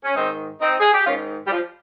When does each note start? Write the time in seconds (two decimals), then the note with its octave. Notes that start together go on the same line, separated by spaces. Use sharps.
0.04 C#4
0.16 G#2 D#3 C4 D#4
0.61 C4 D#4
0.80 G#4
0.93 G4
1.06 G#2 C#4 F4
1.10 D#3
1.47 G3
1.51 F3